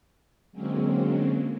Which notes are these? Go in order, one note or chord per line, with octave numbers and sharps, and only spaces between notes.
D3 F#3 G#3 A#3 C4 C#4